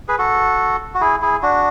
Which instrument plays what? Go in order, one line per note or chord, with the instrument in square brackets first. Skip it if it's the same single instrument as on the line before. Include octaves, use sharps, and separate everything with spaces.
[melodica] G#4 B4
F#4 A4
F#4
E4 G#4
E4 G#4
D4 F#4